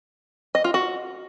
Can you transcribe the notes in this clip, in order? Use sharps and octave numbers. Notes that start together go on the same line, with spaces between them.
D#5
F4
F#4